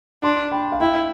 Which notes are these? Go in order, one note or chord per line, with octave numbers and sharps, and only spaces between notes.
D4 A5 C6
G5 B5
F5
E4 E5 G5